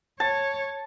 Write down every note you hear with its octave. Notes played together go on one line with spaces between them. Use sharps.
C#5 A5